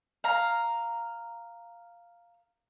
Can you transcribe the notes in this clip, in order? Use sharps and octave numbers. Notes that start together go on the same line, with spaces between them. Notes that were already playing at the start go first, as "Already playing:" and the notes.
F5 A#5